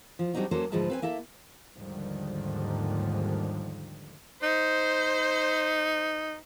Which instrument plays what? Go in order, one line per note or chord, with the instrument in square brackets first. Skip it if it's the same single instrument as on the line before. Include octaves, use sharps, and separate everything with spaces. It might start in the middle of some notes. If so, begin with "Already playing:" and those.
[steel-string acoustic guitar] F3
F#3 G3 C4 D4 D#4 F#4
F#3 A#3 C#4 A4 C5
D2 G#2 F3 G#3 B4 A5
C4 B4 G#5
A#3 E4 A4 E5
[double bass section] D#2 G#2 D3 D#3 F3 G3
[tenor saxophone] D#4 [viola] C5